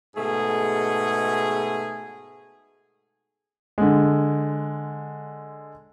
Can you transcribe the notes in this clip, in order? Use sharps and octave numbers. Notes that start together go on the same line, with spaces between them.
G#2 B2 A3 G#4
D3 G#3